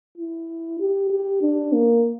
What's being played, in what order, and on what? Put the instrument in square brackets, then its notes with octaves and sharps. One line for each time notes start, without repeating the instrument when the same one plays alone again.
[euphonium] E4
G4
G4
D4
A#3